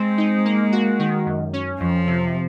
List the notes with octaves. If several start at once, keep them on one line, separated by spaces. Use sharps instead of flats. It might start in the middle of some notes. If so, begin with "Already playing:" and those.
Already playing: G#3 C4
D#4
A#3
F#4
D#3
F#2
C#4
F2 F3
C3